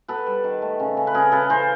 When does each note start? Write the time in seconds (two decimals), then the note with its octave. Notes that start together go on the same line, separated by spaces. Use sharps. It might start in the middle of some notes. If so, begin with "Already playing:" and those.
0.08 B3 A4 B4
0.26 G3
0.44 D#3
0.62 A3
0.80 C#3
0.97 C#3
1.07 B4
1.14 C#3 G#4 A#4
1.32 C#3 A4 B4
1.49 E3 A#4 C5